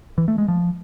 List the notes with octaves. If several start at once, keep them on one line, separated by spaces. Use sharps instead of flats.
E3
A3
G#3
F3